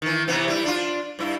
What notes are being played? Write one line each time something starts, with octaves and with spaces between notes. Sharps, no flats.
D#3 E3
C3 E3 B3
G3 E4
D4 F4
G2 E4